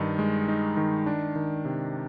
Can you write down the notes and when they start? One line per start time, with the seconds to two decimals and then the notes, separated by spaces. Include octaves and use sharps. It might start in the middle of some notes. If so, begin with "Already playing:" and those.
Already playing: G2 D#3 D#4
0.19 G#3
0.48 D#4
0.77 D#3
1.06 D4
1.36 D#3
1.65 C3